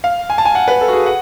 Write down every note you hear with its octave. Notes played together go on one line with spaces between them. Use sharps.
F5
G#5
A5
G#5
F#5
B4
A4
F#4
G#4
F#5